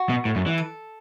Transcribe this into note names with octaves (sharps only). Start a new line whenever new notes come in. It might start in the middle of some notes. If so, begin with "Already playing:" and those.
Already playing: F#4
B2
A2
F#2
E3
A4